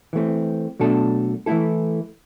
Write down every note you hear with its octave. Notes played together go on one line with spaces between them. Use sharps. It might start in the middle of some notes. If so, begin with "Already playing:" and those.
E3 A3 C4
B2 F#3 A3 D4 A4
E3 A3 E4 A4